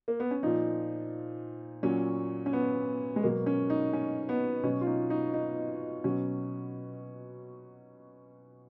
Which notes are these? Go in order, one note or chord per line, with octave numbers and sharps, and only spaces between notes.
A#3
B3
C#4
A#2 F3 D#4
A#2 F#3 C#4
C#4
B3
G#3
B2 F#3 A#3
C#4
D#4
C#4
B3
B2 F#3 C#4
F4
D#4
D#4
D#4
B2 F#3 C#4